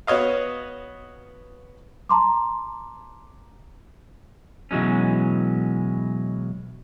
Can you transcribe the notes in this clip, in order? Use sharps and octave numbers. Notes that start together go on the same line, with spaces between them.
B3 F#4 C#5 D#5 F5
A5 A#5 C6 D6
B2 E3 F#3 G#3 C#4